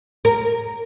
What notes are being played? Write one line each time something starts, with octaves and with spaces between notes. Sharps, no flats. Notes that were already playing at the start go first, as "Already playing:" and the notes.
A#4